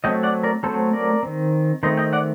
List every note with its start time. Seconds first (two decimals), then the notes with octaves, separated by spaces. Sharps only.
0.04 F#3 A3 C4 D#5 G5
0.23 D5 F#5
0.43 A#4 D5
0.63 F#3 A3 C4 A4 C5
0.93 A#4 D5
1.23 D#3 A3 C4
1.83 D#3 A3 C4 C5 D#5
1.97 D#5 G5
2.13 D5 F#5